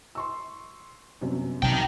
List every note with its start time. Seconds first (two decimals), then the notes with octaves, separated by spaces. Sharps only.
0.15 C6 C#6 E6
1.21 G1 F#2 C3
1.63 B1 C3 F#3 D#4 G5 A5